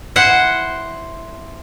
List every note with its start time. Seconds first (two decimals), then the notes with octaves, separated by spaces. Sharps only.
0.16 E4 C5 F#5